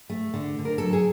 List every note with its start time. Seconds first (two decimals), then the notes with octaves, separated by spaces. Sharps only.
0.10 A3
0.34 D3
0.59 D3
0.65 A#4
0.78 F#3 A4
0.93 G#4